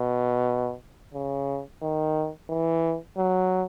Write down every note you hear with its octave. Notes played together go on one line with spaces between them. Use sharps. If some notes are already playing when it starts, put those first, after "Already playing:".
Already playing: B2
C#3
D#3
E3
F#3